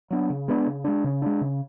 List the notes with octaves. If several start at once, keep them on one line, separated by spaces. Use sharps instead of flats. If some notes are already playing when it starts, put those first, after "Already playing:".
F#3 B3 D4
C#3
G#3 B3 D4
C#3
G#3 B3 D4
C#3
G#3 D4
C#3